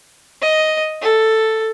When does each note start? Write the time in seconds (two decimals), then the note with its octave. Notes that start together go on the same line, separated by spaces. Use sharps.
0.42 D#5
1.01 A4